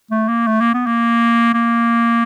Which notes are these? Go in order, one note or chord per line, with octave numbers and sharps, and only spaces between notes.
A3
A#3
A3
A#3
B3
A#3
A#3